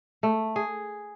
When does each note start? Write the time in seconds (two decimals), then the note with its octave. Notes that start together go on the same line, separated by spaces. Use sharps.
0.23 A3
0.56 G#4